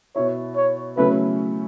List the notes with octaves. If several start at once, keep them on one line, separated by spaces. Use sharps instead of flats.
B2 B3 E4 C#5
C#5
C#3 F#3 A3 C#4 E4 B4